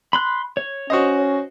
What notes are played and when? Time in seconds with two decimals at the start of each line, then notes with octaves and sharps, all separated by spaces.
0.13 B5 C6 F#6
0.57 C#5
0.90 C#4 F#4 C5 D#5